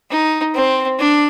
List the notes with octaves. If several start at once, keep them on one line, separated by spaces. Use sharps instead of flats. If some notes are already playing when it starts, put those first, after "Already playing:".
D#4
C4
D4